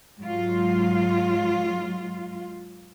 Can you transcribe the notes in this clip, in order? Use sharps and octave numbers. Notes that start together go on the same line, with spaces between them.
G#2 F#3 F4